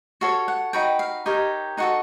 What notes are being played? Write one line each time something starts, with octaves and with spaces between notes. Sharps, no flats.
F#4 A4 C#5 F5
F#5
D#4 F#4 B4 G5
F5
D#4 G4 A#4 C#5
D#4 F#4 A4 F#5